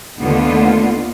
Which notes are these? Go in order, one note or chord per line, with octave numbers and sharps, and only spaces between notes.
D#2 D3 A3 B3 F4